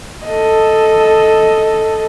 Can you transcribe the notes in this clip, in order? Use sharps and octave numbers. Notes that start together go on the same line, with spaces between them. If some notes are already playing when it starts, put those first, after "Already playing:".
A4 D#5